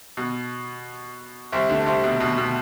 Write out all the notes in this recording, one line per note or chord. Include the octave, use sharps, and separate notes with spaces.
B2
C2 C3
D2 D3
C2 C3
B2
B2
B2